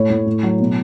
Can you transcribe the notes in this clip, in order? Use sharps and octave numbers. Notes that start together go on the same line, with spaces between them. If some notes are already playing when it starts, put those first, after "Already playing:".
Already playing: A2 C#5
A2
A2
F#3
B2